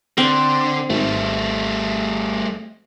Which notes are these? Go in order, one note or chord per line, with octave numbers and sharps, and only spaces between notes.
D3 C4
G#1 G3 A3